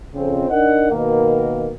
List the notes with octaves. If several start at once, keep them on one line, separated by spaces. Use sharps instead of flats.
F2 C#3 C4
D4 D#4 A#4 D#5 F#5
B2 D#3 A#3